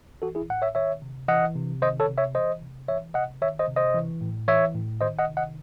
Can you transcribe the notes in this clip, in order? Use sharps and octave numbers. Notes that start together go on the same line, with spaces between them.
E3 F#4 A4
E4 G#4
A2 F#5
C#5 E5
D#3 C#5 E5
C3
E3 D#5 F#5
C3
D#3 C5 D#5
A4 C#5
C3
C#5 E5
E3 C5 D#5
C3
E3 C#5 E5
C3 D#5 F#5
D#3 C#5 E5
C5 D#5
C3
C5 D#5
E3
A2
E3 C#5 E5
A2
D#3 C5 D#5
D#5 F#5
C3
D#5 F#5